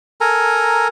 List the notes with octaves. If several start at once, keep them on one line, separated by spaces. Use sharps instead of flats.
A4 A#4 G#5 A#5